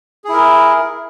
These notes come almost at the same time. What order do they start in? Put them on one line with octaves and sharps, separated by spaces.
G#4 E4 A#4